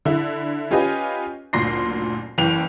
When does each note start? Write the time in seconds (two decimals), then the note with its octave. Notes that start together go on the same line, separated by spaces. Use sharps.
0.05 D3 E4
0.71 C#4 F4 G4 B4 D#5 G#5
1.53 F#1 D2 A#2 C6 A#6 C7
2.38 F#1 E3 G5 F7